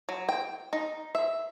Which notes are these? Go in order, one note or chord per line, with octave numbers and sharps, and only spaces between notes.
F#3
G5
D#4
E5